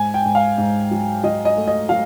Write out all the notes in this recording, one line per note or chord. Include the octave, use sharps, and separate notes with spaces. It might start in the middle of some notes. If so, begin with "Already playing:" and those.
Already playing: G#2 G#5
G5
G#2
F5
G#2
F#3
F#3 D#5
D#5
A3
D#5
F#3 F5